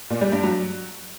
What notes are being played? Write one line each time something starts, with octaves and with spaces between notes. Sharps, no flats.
A#2
G3
G2
F#3